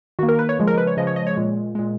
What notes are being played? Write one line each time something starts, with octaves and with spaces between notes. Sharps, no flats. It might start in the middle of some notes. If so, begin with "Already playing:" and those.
D#3 A#3 F#4
A#4
B4
C#5
C#3 F3 G#3
A#4
B4
C#5
C#3 F3 G#3 D#5
C#5
D#5
C#5
A#2 G#3
A#2 G#3